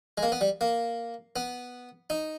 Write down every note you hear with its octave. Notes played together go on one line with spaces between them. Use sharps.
G#3
A#3
B3
G3
A#3
B3
D#4